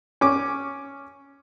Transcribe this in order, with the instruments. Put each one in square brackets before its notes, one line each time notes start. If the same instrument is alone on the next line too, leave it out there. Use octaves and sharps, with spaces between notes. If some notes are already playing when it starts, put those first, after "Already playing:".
[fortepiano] C#4 D6